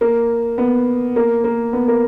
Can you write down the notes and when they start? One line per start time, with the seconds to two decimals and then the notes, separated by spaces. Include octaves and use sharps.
0.01 A#3
0.58 B3
1.16 A#3
1.44 A#3
1.73 B3
1.88 A#4